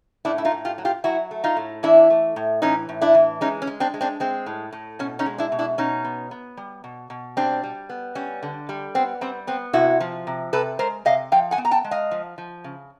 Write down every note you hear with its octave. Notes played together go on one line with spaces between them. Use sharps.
A2 D4 E4
E4
D#4 F4
A2
F4 G4
F#3
F4 G4
F#3 E4 F#4
A3
D#4 F4
A2
E3 D4 E4
A3
A2
E3 C#4 D#4
A2
D4 E4
E3
G#3 C#4 D#4
C#4
G#3
C4 D4
G#3
C4 D4
G#3 C4
A2
A2
B2 C#4
C#4 D#4
G#3
D4 E4
B2
D4 E4
B2 C#4 D#4
B3
B3
G3
B2
B2
G3 C4 D4
G3
B3
G3 C#4
D3
G3
B3 C4
G3 C4
B3 C4
C3 E4 F#4
F3
C3
C3 A4 B4
G#3 A#4 C5
C3 D#5 F5
F3 F5 G5
F#5 G#5
B3
A#5
G5 A5
G#3
D#5 F5
F3
F3
C#3